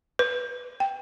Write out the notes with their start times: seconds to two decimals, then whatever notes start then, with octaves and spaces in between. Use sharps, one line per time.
0.19 B4
0.80 G5